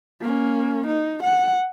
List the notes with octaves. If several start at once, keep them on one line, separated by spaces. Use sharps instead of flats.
A#3 C#4
D#4
F#5